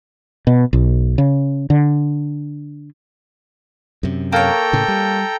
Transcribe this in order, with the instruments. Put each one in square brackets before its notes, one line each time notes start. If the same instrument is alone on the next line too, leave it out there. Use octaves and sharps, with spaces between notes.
[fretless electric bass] B2
B1
C#3
D3
[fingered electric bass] F#2 C3
[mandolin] A#3 C#5 [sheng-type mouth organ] A4 G5 A#5
[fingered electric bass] A2 C#3
G3